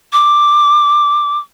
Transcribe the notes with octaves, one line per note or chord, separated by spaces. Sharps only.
D6